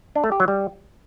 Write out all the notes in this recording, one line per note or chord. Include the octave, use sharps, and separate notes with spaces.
D4
A3
G4
F#3
G3